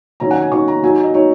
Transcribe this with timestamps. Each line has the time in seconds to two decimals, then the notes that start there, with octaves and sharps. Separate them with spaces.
0.20 D#3 F#3 C#4 A#5
0.31 F#5
0.42 G#5
0.52 D#3 F#3 C#4 C#6
0.68 A#5
0.84 F#3 D#4 G#5
1.04 D#5
1.14 F#3 D#4 C#5